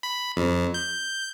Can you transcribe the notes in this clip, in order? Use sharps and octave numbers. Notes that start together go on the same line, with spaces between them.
B5
F2
G6